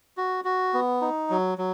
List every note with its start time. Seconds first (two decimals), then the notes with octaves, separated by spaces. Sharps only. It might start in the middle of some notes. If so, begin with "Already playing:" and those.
0.17 F#4
0.44 F#4
0.74 B3
1.01 D#4
1.30 F#3
1.58 F#3